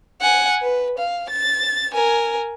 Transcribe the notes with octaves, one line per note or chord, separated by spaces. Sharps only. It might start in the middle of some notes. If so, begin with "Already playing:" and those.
F#5 G#5
B4
F5
A6
A#4 G#5